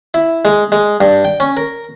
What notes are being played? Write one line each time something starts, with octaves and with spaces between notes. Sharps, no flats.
E4
G#3
G#3
G2
G5
C#4
A#4